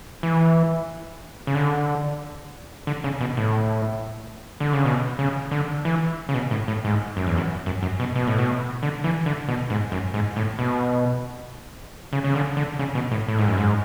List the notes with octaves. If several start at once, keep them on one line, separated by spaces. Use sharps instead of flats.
E3
C#3
D3
D3
C#3
B2
A2
D3
C#3
B2
C#3
D3
E3
C#3
B2
A2
A2
G#2
F#2
E2
F#2
F#2
F#2
B2
B2
A2
B2
D3
E3
D3
B2
G#2
F#2
G#2
A2
B2
C#3
C#3
D3
D3
C#3
B2
A2
A2
G#2
F#2
G#2